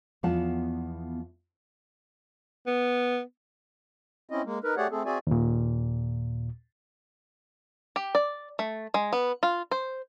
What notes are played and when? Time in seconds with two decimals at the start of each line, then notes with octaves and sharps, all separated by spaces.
0.23 E2 F3 B3 F5 F#5 A5
2.67 B3
4.30 C4 C#4 E4 D#5
4.45 G#3 A#3
4.64 D#4 A#4 B4
4.77 A3 G4 G#4 C#5 D5 F#5
4.91 A3 C4 G#4 A4
5.05 C4 F#4 G#4 D5 E5 G#5
5.27 D#2 A#2
7.96 G4
8.15 D5
8.59 A3
8.94 G#3
9.13 B3
9.43 F4
9.71 C5